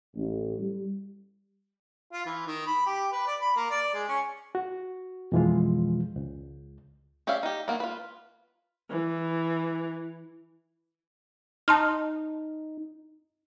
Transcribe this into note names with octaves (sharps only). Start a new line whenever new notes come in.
A1
G3
F4
E3
D#3
B5
G4
B4
D5
B5
A#3
D5
G#3
C#4
F#4
F2 B2 E3 F3 G#3 F4
C#2
C#4 G4 D5 E5 F5
D#4 G4
D#3 A#3 B3
F4 B4
E3
D#4 A5 C6 F6